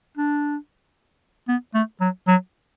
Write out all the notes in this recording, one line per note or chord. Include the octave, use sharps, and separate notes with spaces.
D4
B3
A3
F#3
F#3